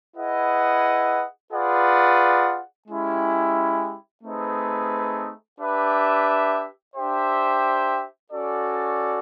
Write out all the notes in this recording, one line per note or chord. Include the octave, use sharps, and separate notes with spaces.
E4 G#4 B4 D#5 F#5
F4 G#4 B4 D5 F#5
G#3 C#4 E4 G4
A3 C4 D#4 G#4 B4
D4 G4 B4 E5
D4 G4 C5 E5 G5
C#4 F#4 A4 D5